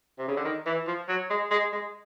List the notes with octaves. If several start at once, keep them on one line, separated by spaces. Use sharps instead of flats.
C3
C#3
D3
D#3
E3
F3
F#3
G#3
G#3
G#3